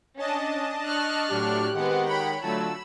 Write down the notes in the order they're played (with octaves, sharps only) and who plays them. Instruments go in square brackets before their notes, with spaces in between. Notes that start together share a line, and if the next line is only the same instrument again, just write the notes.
[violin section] C#4 [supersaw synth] D4 D#5 A5
[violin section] C#6 F6 F#6
[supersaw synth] A2 [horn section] F#3 D4 [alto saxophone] G4
[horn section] D#3 G#3 [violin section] B3 C4 [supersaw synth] F#5
[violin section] C#5 G5 B5
[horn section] D3 F4 A5 [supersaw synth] F#3 A3 [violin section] B5 E6